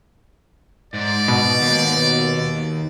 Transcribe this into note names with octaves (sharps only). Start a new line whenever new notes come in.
G#2 D5
B2
D#2